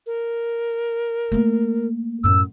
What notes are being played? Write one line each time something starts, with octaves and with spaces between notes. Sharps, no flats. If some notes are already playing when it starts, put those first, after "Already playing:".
A#4
A3 A#3
F#2 A2 E6